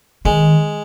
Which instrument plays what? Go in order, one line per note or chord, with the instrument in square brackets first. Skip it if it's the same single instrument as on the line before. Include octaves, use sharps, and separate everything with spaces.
[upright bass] D#3 [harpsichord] G#3